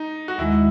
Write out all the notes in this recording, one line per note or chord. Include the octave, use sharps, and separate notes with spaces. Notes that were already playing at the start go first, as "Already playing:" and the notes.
Already playing: D#4
F#4
D#2 D#3 G#3 E4